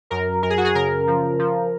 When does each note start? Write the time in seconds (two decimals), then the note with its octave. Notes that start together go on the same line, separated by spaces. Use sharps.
0.10 F#2 A#4
0.43 F#2 A#4
0.50 G#4
0.57 F#4
0.65 G#4
0.75 C#3 A#4
1.07 F3
1.39 F3